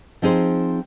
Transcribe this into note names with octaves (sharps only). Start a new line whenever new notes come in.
F3 C4 D#4 G#4 C5